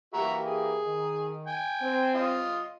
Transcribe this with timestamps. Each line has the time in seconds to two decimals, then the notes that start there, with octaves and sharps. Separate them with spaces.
0.14 E3 A#3 F#4 G4 E5 A#5
0.46 G#4
0.82 D#3
1.47 G5 G#5
1.81 C4
2.15 F4 D#5